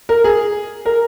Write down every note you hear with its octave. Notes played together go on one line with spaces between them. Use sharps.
A#4
G#4
A#4